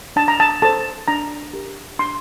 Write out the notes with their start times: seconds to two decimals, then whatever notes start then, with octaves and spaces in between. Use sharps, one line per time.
0.16 D4 A5
0.28 A#5
0.40 A5
0.62 A4 C5 A5
1.08 D4 A#5
1.53 G4 A#4
1.99 D4 C6